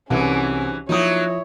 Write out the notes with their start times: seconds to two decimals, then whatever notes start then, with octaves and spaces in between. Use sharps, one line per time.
0.10 C2 G#2 E3 F#3 C#4
0.89 F3 F#3 A#3 D#4 E4 C#5 D#6